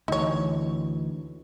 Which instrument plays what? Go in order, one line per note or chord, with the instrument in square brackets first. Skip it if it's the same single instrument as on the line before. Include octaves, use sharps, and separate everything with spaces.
[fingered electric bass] D2 E3 [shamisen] D#4 C#5